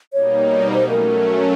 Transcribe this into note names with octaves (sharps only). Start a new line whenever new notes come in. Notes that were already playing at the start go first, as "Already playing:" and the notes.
B2 G3 A#3 D#4 C#5
F#3 A3 C#4 C5
A#4